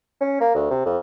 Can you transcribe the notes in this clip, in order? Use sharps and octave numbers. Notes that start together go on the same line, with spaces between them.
C#4
A#3
D2
C3
F2